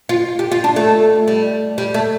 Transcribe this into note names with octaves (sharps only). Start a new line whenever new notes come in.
F4
G4
F4
D4
A3
G3
G3
A3